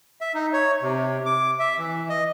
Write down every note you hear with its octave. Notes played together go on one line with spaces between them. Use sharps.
E5
D#4
C#5
C3
D6
E5
E3
D#5